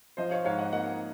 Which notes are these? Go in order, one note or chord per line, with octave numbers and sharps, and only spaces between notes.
F3 C5 D#5
C#5 F5
G#2 C#5 F5
D#5 F#5
A#3 D#5 F#5